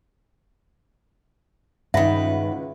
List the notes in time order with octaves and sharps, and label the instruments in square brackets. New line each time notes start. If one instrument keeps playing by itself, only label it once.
[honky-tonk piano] C#2 F#5 B5 [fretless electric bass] G2 [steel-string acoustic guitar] D#3 B4 [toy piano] E5